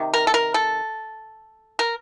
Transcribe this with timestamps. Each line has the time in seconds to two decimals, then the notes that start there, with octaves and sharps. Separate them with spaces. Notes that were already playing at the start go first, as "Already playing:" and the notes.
Already playing: C3 D#3
0.14 A#4
0.27 A4
0.34 A#4
0.54 A4
1.79 A#4